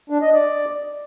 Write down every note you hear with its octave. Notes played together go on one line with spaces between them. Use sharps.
D4
D#5
D5